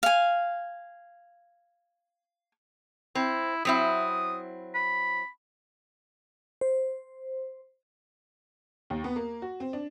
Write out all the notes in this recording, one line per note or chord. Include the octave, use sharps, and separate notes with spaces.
F5 G#5
C4 E4
F#3 C4 E4 D#6
B5
C5
D#2
B3
A#3
F#4
C4
D4